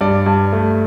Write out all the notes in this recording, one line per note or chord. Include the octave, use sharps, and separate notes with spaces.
G2 D5
G2
A3